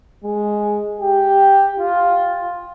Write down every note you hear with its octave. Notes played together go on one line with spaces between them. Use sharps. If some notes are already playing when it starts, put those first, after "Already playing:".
G#3
G4
F4